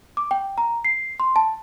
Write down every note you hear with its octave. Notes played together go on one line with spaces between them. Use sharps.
D6
G5
A#5
C7
C6
A5